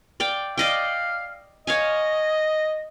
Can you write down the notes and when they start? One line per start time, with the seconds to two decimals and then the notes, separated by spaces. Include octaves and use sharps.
0.20 D5 F5 G5
0.57 D5 D#5 F5 G5
1.67 C#5 D#5 F5 G#5